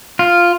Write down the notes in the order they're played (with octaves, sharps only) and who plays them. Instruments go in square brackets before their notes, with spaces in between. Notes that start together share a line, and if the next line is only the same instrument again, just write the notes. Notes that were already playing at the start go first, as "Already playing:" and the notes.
[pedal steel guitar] F4